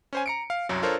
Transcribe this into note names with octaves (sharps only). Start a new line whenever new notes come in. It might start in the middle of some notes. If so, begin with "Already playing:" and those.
C#4 C5 G#5
A#5 C#7 D7
F5
C2 F#2 F#3
D4 F4 A4 A#4 C5 C#5